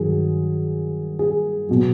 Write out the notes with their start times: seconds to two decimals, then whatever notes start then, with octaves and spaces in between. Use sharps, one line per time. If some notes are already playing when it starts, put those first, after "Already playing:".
Already playing: G2 D#3 F#3 G#4
1.19 G#4
1.69 B2 F#3